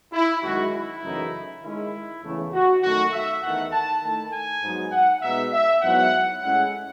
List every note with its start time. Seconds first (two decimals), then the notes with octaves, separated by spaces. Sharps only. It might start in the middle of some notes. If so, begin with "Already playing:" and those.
0.13 E4
0.42 F#2 D#3 G#3 C#4 F#4
0.72 E4
1.03 F#2 C#3 E3 A3 D#4
1.62 D#3 G#3 C#4 E4
2.23 E2 C#3 E3 A3
2.53 F#4
2.83 F#2 D#3 A3 F#4
3.12 E5
3.43 E2 D#3 A3 F#5
3.72 A5
4.02 D#3 A3 E4 A5
4.32 G#5
4.63 G#2 F#3 B3 D#4
4.92 F#5
5.22 B2 G#3 B3 D#4 E5
5.53 E5
5.82 G#2 F#3 B3 E4 F#5
6.42 A2 G#3 C#4 E4 F#5